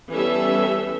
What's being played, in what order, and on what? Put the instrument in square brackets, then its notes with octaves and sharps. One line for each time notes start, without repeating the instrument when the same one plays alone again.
[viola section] E3 G3 B3 C#4 A4 E5